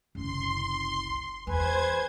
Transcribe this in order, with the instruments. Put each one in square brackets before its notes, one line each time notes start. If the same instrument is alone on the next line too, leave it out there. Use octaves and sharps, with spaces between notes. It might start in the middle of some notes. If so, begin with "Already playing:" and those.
[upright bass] F#1 C2 [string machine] C6
[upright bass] E2 [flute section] B4 G#5 [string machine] C5 G#6